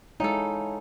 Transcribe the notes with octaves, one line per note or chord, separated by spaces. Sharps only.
G#3 D#4 E4 A4 C#5 F5 G#5